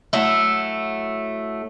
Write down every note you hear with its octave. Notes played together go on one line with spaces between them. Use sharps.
F#3 A3 E4